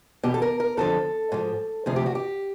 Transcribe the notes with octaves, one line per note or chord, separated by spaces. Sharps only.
E2 B2 G4
A4
A#4
A#4
F2 D3 F3 A4
G#2 F3
D2 C3 F3 G#4
G4
F#4
G4